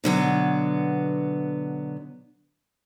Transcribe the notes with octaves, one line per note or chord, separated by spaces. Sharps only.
B2 D3 F#3 B3